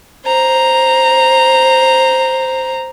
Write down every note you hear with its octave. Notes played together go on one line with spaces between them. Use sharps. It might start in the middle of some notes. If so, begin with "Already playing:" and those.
C5 A#5